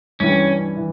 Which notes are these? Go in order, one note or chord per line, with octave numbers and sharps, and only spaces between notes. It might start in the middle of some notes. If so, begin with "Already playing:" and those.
G2 E3 G3 C#4
E3